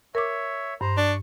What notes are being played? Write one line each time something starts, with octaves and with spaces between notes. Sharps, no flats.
A#4 C#5 E5 D6
G2 C5 A#5
D4 C#6